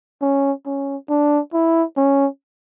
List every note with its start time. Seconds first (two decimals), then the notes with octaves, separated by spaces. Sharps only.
0.21 C#4
0.66 C#4
1.10 D4
1.53 E4
1.97 C#4